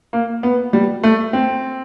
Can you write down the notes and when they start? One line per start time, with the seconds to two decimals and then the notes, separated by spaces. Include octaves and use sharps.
0.13 A#3
0.43 B3
0.73 G3
1.03 A3
1.33 C4